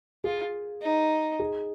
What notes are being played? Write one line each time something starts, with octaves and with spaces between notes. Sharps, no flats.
F4 G#4
D#4
G#4